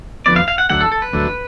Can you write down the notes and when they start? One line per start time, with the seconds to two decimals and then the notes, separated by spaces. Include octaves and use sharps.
0.26 F2 D3 F3 B3 D5
0.36 F5
0.48 F5
0.58 F#5
0.70 D2 D3 F#3 A3 F#5
0.81 A4
0.92 A4
1.02 B4
1.12 D2 D3 F#3 A3